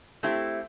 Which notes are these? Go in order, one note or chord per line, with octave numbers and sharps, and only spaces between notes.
A3 C4 E4 G4